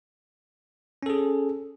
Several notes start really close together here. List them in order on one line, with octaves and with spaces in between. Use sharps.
C#4 A4 G#4